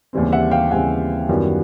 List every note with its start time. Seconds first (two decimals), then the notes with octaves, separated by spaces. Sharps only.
0.13 D#2 C#3 E3 G3 C4
0.32 E5 F#5
0.51 F5 G5
0.71 D#2 C#3 E3 G3 C4 F#5 G#5
1.29 F#2 D#3 G3 B3 E4